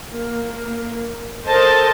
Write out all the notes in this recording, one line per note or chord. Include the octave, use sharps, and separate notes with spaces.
A#3
A4 A#4 C5 D#5 A5